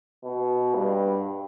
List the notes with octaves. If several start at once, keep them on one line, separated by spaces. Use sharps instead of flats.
B2
G2